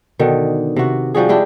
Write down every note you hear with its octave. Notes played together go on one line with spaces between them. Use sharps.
B2 D3 D#3
C3 F#4
F3 G3 F#4 G#4
G#3 D4 E4 G4